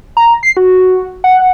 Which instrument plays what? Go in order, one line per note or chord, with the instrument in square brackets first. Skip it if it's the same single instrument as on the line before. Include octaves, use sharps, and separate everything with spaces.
[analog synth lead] A#5
C7
F#4
F#5